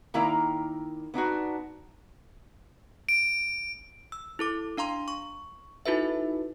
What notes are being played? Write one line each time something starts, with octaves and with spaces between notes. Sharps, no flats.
D#3 A#3 E4 D5 A#5
B3 D4 D#4 F#4
D7
E6
E4 A4 D6
D4 F5 A#5 C6
C#6
D#4 E4 F#4 A4 B4 E5